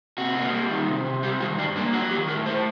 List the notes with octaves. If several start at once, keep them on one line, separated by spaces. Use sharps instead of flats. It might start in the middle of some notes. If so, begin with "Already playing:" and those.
C3 F#4
A#3
G3
D#3
C3
C3
G3 G4
D#3 F#4
G2 D4
A#3 D4
F#3 F#4
D#3 G4
A2 A#4
A2 C5